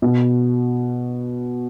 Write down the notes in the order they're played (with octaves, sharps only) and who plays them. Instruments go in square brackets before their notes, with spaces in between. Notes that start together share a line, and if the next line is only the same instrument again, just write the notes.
[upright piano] B2